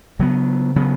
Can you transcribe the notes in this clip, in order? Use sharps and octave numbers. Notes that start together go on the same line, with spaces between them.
C#3 F#3 B3
C#3 F#3 B3